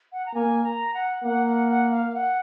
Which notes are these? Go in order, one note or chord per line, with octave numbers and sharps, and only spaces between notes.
F#5
A#5
A#3 G#5
A#5
F#5
A#3 F#5
F#5
F#5
F5
F5
F#5